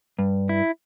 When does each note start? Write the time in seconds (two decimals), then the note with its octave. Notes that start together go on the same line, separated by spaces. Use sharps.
0.19 G2
0.49 E4